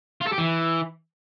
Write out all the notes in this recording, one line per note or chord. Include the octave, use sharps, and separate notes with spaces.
F4
A4
G4
E3